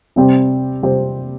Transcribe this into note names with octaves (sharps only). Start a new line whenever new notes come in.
C3 G3 C4 G4 C5
C3 G3 C4 G4 C5